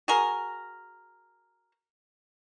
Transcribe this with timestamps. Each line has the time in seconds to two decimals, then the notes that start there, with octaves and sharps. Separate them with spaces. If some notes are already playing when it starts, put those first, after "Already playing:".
0.08 F#4 G#4 A#4